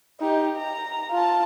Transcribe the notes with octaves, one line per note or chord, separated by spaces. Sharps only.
D#4 G4
A#5
F4 A5